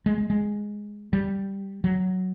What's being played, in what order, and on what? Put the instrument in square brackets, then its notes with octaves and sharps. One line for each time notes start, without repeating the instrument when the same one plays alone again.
[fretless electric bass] G#3
G#3
G#3
G3
F#3